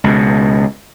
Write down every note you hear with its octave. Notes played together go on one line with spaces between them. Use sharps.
C#2 B2